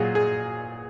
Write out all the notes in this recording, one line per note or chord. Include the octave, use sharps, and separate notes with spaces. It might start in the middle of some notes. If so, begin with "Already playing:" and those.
Already playing: A#2 F#3 F4 F#4 G#4
G#4